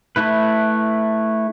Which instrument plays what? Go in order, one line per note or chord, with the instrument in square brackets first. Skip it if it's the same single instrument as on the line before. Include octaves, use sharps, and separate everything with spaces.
[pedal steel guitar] A3 E4 B4